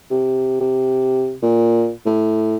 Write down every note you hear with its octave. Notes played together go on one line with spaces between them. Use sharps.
C3
C3
A#2
A2